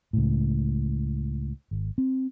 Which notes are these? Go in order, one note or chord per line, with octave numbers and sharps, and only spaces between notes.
C#2 A2
G#1
C4